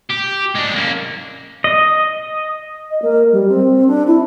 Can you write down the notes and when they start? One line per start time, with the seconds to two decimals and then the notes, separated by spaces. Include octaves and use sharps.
0.10 G4
0.55 G#3 D4
0.75 A#3 C#4
1.64 D#5
2.90 D#5
3.02 A#3
3.32 G3
3.48 C4
3.88 D4
4.07 E4